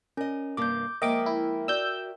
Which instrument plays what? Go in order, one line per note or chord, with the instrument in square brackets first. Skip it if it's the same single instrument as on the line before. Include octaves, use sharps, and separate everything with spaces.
[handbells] C#4 [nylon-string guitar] A#4 D#5
[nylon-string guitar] G2 C3 A#3 [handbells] D6 G6
[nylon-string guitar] F3 G#3 A#3 [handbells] A#4 E5 G5 [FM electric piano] D#5 D6
[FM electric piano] E4
[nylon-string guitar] F#4 D5 [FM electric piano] E6 G6